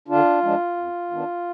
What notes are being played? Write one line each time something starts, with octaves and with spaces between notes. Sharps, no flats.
D3 D4 F4
F3 G#3 D4
F2
D#3 B3 D4